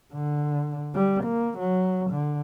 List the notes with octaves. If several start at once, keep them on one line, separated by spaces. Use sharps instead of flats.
D3
G3
A#3
F#3
D3